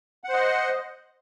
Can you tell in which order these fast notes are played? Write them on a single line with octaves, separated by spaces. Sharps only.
F#5 C5 D#5